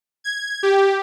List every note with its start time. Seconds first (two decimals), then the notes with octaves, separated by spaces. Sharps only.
0.24 G#6
0.63 G4